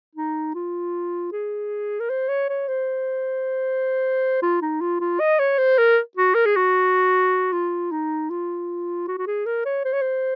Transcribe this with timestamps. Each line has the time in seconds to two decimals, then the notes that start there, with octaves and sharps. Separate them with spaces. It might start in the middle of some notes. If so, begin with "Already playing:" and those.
0.15 D#4
0.55 F4
1.32 G#4
2.00 A#4
2.10 C5
2.28 C#5
2.49 C#5
2.68 C5
4.42 F4
4.62 D#4
4.81 F4
5.00 F4
5.20 D#5
5.39 C#5
5.58 C5
5.78 A#4
6.17 F#4
6.34 A#4
6.46 G#4
6.56 F#4
7.52 F4
7.92 D#4
8.30 F4
9.08 F#4
9.18 F#4
9.27 G#4
9.46 A#4
9.65 C#5
9.85 C5
9.93 C#5
10.01 C5